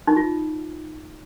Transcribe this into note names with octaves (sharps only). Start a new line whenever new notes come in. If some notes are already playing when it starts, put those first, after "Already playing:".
D#4
F4